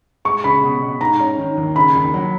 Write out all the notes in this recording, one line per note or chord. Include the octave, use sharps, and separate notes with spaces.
G#3 C#6
C#3 B5
B2
B2
G#2 A#5
C#4
D#3
D#2
C#3 B5
D#2
F#3